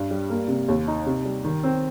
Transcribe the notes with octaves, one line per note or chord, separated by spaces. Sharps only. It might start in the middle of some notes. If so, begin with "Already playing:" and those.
Already playing: G2
G3
A#3
C3
D#2
D#4
C3
G3
D#3
C4